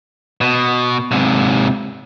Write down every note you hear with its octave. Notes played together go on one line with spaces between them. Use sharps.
B2
G#2 C3